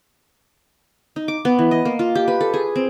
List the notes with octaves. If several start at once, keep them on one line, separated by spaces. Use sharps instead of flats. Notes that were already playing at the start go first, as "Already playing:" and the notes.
D#4
D6
B3
E3
D#5
A#3
F4
G4
B4
A4
G#4
C4